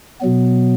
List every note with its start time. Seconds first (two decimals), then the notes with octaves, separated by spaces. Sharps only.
0.21 B2 F#3 B3